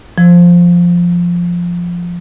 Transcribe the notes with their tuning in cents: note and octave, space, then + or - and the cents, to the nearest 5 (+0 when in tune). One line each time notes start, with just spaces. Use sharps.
F3 +0